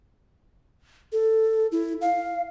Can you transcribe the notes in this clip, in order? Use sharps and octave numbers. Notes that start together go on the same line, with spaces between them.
A4
E4
F5